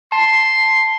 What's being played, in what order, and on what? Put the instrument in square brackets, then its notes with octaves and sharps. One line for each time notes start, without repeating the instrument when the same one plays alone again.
[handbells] A5 [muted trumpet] C6